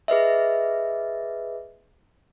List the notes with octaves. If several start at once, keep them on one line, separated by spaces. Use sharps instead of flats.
G#4 B4 D#5 E5